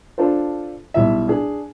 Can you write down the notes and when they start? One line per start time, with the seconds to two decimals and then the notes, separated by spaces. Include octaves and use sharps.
0.18 D4 F4 A4 C5
0.94 B1 G3 E4 E5
1.27 D4 G#4